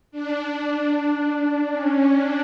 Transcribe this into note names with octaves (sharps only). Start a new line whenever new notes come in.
D4
C#4
D4